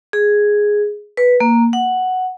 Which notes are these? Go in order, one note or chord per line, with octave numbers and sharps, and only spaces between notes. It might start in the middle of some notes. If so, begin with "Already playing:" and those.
G#4
B4
A#3
F#5